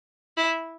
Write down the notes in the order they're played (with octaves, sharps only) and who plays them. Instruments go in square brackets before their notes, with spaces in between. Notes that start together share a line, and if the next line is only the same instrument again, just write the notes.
[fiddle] E4